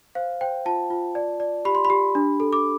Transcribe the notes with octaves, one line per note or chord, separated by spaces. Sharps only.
C5 F5
C5 G5
F4 A5
F4
D5
D5
G4 B5
C6
B5
G4
D4
A4
D6